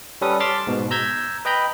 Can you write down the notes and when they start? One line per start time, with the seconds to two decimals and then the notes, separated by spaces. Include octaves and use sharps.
0.21 G3 C#4 A4 B4 D#6
0.40 A5 C6 D6 F6 A6 B6
0.67 G#2 B2
0.91 A#5 E6 G6 G#6 B6
1.45 B4 D#5 G5 A#5 B5 G6